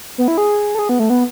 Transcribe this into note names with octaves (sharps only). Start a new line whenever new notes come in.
B3
E4
G#4
A4
G#4
B3
A3
B3